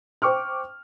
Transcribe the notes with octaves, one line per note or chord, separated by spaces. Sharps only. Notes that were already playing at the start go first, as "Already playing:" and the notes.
C5 G5 C#6 D6 F6